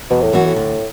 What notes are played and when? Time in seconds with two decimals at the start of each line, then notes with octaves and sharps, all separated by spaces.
0.10 E2 B2
0.22 A2
0.33 F#2 E3 B3 F#4
0.46 A2
0.56 D2